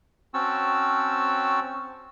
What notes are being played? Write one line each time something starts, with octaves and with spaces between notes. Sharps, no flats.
C4 C#4 F#4 A5 E6